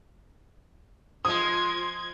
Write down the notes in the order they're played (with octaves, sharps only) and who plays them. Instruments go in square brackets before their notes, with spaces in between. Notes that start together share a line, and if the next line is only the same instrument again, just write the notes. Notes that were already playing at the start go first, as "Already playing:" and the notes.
[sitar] F3 G#3 [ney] F4 [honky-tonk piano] D#6 [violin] G#6